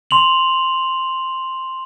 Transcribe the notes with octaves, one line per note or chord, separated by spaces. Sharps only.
C6 F7 F#7